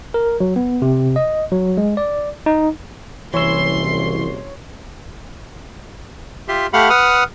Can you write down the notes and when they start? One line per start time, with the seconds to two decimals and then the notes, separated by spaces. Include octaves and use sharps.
0.14 A#4
0.40 F#3
0.56 B3
0.82 C3
1.16 D#5
1.52 F#3
1.77 G#3
1.97 D5
2.46 D#4
3.34 F#1 C2 E3 C#5 E5 C6
6.48 F4 G4 E5 C6
6.73 A3 G4 F5 F#5 B5
6.90 B4 F#5 D#6 F6